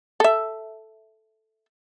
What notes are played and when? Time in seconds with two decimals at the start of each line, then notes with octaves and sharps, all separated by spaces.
0.20 A4 E5